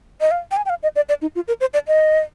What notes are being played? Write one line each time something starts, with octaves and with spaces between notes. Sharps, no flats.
D#5
F5
G5
G#5
G5
F5
D#5
D5
D5
D#4
F4
A#4
C5
D5
D#5